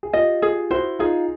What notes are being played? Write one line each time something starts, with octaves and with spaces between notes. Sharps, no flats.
G#4
F4 G4 D#5
F4 G4 G#4
E4 F#4 C5
D#4 F4 G#4